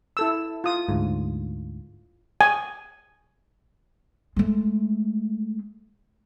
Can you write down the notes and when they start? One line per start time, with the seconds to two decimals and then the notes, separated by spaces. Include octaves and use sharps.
0.17 E4 A4 E6
0.64 F4 D#6
0.89 D2 G#2
2.41 G#5
4.36 G#3 A3